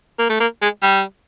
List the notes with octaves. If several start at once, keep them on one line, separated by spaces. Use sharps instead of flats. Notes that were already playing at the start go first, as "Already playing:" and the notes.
A#3
A3
A#3
G#3
G3